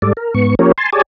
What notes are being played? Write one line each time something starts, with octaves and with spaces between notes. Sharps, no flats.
G#2 G3 A4 D5
A#4
G#2 B3 C#6
F3 A#3 C#4 G4 A#4 C#5
G#5 A5 C6
G4 G#4 C#5 D5 G#5 A5